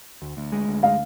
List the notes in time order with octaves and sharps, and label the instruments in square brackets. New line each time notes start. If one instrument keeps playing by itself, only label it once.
[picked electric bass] D2
D2
G#3
D2
[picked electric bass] G#3 [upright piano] F5